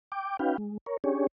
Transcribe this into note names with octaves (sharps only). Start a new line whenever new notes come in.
G5 D6
C#4 D#4 F#4 B4 F5 G5
G#3
A#4 C#5
C#4 D4 G4 G#4 C#5